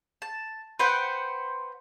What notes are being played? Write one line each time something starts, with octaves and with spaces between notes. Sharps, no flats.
A5
B4 C5 F#5 G5